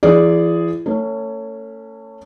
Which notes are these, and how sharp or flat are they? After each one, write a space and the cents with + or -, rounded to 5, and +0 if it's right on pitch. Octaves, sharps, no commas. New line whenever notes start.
E3 +40 G#4 +0 D5 -5
A3 +35 C#4 +5